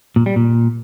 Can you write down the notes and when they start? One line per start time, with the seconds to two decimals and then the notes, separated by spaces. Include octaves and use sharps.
0.16 A#2
0.26 G3
0.36 A#2